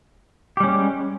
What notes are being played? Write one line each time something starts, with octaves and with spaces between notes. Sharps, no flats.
G3 G#3 C#4 G4